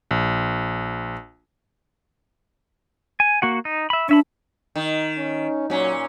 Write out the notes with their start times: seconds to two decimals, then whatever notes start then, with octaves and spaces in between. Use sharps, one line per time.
0.11 A#1
3.20 G#5
3.42 A#3 F#4 F#5
3.65 D#4
3.90 E5 B5
4.09 C#4 D4 E5 B5
4.76 D#3
5.17 C#4
5.70 A#2 F#3 C#4